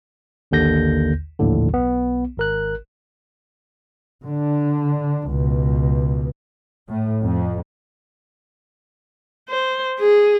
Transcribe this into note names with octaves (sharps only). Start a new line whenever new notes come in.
A1 D#2 D3 G6 A#6
A#1 D#2 A2 D3
B1 B3
G#1 A#4 F#6
D3 D4
C#2 B2
A2
F2
C5
G#4